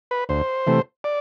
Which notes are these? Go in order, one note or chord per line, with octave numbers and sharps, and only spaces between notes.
B4
D2 C5
C3 E3 A3
D5